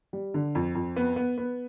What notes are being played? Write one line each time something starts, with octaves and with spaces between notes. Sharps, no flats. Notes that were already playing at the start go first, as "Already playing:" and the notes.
G3
D3
F2
F2
B3
B3
B3